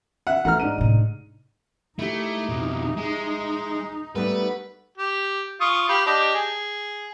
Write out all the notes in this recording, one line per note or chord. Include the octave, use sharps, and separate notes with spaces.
E5 F#5
E3 A3 D#4 F#5 A#5 F6
G#2 D4 D#7
A2 C3
A3 D#4 E4 G4
F2 B2
G#3
G3 A3 B3 B4
G4
F4 C#6 D#6
G4 F5 B5
D4 G4 D#5
G#4